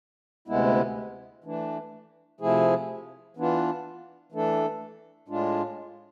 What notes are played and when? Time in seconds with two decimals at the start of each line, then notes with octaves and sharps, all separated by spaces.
0.48 D2 C3 G#3 B3 E4
1.44 E3 A3 D4
2.40 C3 F3 A3 E4 G#4
3.37 E3 B3 D4 F4
4.32 E3 A3 D4 A4
5.28 A2 G#3 D4 F4